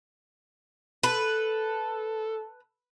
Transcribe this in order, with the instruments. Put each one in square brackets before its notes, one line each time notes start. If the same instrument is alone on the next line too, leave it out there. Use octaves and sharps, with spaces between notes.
[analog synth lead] A4 [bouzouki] B4